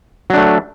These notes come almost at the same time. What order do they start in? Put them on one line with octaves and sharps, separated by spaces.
F#3 D4 A3